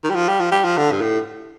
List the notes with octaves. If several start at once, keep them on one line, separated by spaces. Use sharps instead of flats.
D#3
G3
F3
G3
F3
G3
F3
D3
G2
A2